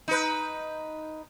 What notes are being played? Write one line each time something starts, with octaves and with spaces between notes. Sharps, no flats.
D#4 B4